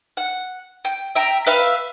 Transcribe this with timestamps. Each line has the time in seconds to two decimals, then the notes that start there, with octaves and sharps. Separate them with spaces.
0.17 F#5
0.85 G5
1.15 E5 G5 A#5
1.46 B4 E5 F5